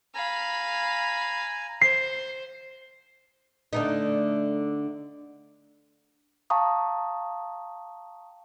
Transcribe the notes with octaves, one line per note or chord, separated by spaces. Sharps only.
F5 G#5 A#5 B5
C5 C7
D3 A3 D#4
F5 G5 A5 A#5 C#6 D#6